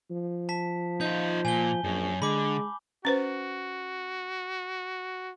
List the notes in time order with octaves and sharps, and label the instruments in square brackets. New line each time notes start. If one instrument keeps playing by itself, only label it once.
[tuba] F3
[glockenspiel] A5 B6
[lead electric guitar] D#4 F4 [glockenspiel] G6
[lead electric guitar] A#2 [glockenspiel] G#5 G7
[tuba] A#1 [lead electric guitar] F#2
[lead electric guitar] D3 [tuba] G#3 [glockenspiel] B5 D6
[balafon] C#4 B4 C5 [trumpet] F#4